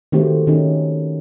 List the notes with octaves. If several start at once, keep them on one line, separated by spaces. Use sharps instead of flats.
D#3 A3 C4 F#4 G4 C5
D#3 C#4 D#4